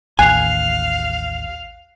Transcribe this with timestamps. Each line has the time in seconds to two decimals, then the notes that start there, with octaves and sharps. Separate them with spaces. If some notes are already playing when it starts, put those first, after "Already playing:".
0.19 A1 D#2 F5 G#5 F#6 C7 F7